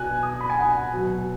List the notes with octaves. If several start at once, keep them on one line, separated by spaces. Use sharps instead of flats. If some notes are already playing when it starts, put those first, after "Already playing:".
Already playing: B2 G#5 F#6
D#6
B5
G#5
F#5
B2 F#3